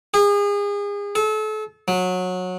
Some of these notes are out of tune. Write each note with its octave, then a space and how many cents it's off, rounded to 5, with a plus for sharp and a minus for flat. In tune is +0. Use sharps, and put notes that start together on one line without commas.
G#4 -35
A4 -35
F#3 -20